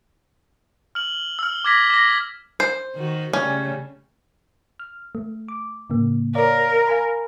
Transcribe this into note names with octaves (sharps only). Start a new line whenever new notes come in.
F6 F#7
E6 F6
D6 F6 G#6 A#6 B6
D6 A#6
C5
D#3 F#4
C#3 G3 A3 C#4
F6
A3
D6
A2 C#3 A#3
A#4 C#5 D5 F5
F5 G#5 B5